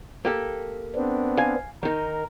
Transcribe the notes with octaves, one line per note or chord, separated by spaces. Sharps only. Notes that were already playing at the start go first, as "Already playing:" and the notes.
A#3 G4 A4
B3 C4 D4
F5 G#5
D#3 D#4 A#4